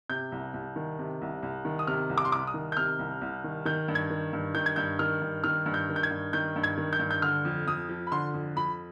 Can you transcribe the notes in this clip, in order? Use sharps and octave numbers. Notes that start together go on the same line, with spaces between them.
C3 G6
C2
C2
D#3
C3
C2
C2
D#3
D#6
C3 F6
C2
D6
C6
C2 D6
D#6
D#3
G6
C3 F6
C2
C2
D#3
D#3 G6
G2
G#6
D#3
G2
D#3 G6
G#6
G2 G6
D#3 F6
G2
D#3 F6
G2
G6
D#3
G6
G#6
G2
D#3 G6
G2
G#6
D#3
G6
G2
G6
D3 F6
F2
F2 D#6
F3
B5
D3 C6
F2
F2 B5